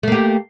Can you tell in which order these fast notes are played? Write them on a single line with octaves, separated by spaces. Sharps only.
A3 A#3 G4